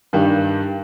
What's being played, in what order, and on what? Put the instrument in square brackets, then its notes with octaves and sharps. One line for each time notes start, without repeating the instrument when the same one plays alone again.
[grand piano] G2 D#3 G3